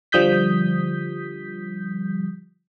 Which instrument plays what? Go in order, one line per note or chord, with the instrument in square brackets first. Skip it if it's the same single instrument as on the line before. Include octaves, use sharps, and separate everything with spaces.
[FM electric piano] D3 F3 G3 D#6 G6 B6